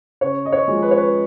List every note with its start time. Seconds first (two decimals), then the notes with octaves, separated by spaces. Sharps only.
0.21 C#3 C#5
0.45 D#5
0.52 C#5
0.68 F3 G#3
0.83 B4
0.91 C#5
0.98 B4